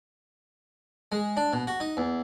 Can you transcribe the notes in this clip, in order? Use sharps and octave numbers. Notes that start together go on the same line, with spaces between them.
G#3
D4
B2
F#4
D#4
E2